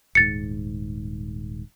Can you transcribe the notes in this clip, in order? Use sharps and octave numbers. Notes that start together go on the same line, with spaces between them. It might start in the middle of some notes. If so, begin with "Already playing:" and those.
D#1 G#2 A6 C#7